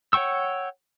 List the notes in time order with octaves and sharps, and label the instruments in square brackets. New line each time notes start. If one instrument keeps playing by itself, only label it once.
[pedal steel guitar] C#5 F#5 G5 C#6 E6